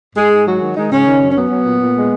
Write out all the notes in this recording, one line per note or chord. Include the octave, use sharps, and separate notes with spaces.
G#2 G#3 G#4
G#2
F#3 G#3 F#4
D#3
D#3 G#3 D#4
G#2 C#3 C#4
D#3
F#2
C#4
F#3 B3
F#3
A#2
A#2
G#3